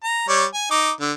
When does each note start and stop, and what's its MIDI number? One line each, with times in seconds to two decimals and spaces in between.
0.03 0.26 82
0.29 0.45 55
0.29 0.45 73
0.29 0.45 74
0.54 0.66 80
0.71 0.90 63
0.71 0.90 86
1.00 1.12 50